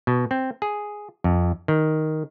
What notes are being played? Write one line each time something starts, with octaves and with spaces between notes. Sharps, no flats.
B2
C4
G#4
F2
D#3